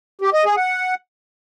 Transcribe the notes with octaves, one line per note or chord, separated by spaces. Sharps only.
G4
D#5
G#4
F#5